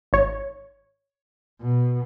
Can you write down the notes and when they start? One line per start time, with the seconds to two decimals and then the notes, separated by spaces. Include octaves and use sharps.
0.13 G#1 C#5
1.61 B2